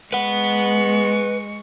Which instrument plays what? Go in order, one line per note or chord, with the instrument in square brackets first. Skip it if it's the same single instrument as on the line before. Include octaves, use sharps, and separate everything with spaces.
[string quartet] G#3 C#6 [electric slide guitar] B4 F#5